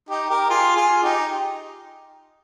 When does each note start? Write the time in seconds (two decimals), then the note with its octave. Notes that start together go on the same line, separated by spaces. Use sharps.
0.09 D#4 G4
0.30 G4 A#4
0.50 F4 G#4
0.76 F4 G#4
1.03 D#4 G4